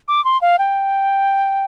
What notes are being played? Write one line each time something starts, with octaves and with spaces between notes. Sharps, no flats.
D6
C6
F5
G5